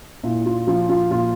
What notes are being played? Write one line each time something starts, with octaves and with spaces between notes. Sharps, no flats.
A#2 E4
F4
F3 F4
F4
A#2 F4